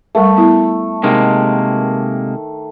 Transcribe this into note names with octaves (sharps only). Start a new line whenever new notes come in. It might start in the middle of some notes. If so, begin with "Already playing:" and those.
G3 A3 A#4
B3 E4
C3 D#3 G#3 A#3